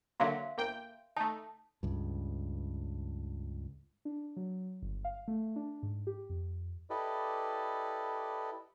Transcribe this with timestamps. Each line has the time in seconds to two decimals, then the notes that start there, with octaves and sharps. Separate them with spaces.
0.20 D3 F#3 A#3 E5 F5 C6
0.57 G1 A#3 G5
1.17 A3 D#4 A5
1.83 C#2 G2
4.05 D4
4.36 F#3
4.82 G1
5.05 F5
5.28 A3
5.56 D4
5.83 G#2
6.07 G4
6.30 F2
6.90 E4 G4 A4 B4 D5 D#5